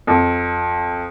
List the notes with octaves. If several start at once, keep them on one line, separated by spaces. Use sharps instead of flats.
F2